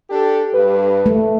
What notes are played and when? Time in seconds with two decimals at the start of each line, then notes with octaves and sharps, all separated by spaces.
0.10 D4 G4 A4
0.53 G2 B4
1.06 A3